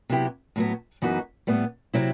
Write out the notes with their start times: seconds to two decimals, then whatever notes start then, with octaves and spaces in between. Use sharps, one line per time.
0.09 C3 F#3 B3 E4 G4
0.56 A2 F#3 B3
1.02 F#2 E3 B3 D#4 F#4
1.47 A2 G3 B3
1.93 C3 F#3 C4 E4